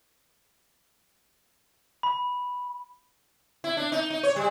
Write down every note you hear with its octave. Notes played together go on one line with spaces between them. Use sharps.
B5
E4
D4
D#4
D#4
C#5
G3